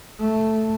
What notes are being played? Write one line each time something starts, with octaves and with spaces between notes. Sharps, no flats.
A3